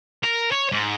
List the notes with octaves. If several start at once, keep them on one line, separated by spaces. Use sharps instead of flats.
A#4
C#5
G#2